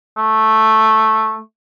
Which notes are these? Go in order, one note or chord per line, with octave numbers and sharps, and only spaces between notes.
A3